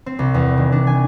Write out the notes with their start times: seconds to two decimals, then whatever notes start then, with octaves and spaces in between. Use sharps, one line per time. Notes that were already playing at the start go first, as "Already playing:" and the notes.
0.06 C4
0.19 C2
0.34 E2
0.57 D#3
0.72 D4
0.87 G#5